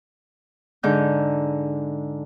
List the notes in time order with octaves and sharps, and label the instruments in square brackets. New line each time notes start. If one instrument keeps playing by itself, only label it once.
[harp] G#2 D3 D#4 G6